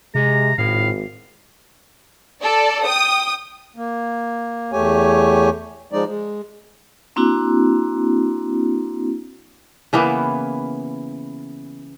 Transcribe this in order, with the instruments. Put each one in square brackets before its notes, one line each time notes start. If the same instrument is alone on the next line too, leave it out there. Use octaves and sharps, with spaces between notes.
[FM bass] C3 [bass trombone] G#3 [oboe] A#5
[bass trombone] G#1 [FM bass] A2 [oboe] F5
[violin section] A4 D5
G5 D#6
[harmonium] A#3
E2 A3 G4 C#5 G#5
F3 G#3 D#4 D5
G#3
[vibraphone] A#3 C4 D4 E4 F#4
[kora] C#3 E3 A#3 B3